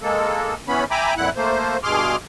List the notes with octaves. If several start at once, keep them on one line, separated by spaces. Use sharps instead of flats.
G#3 A#3 A4
E3 B3 C#4 B5
E5 G5 G#5 A#5 B5 D6
F2 A#2 E4 F#5 F#6
A3 A#3 C5
G2 B2 G#4 C6 D6 F6